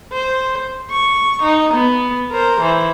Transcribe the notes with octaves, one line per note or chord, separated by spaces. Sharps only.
C5
C#6
D#4
B3
A#4 C5
E3 C5